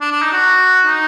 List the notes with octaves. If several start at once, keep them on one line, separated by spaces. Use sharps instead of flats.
D4
D4
D#4
F#4
D#4